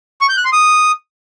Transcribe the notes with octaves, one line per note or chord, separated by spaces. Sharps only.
C#6
G6
F#6
C6
D#6